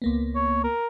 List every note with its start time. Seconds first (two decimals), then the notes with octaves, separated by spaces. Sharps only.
0.02 C#2 A#3 B3
0.35 C#5
0.64 A#4